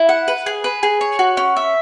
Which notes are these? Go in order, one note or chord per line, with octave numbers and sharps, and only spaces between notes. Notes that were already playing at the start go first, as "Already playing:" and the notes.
Already playing: E4
F#5
B4
G#4
B4
G#4
C#5
F#4
C#4
E5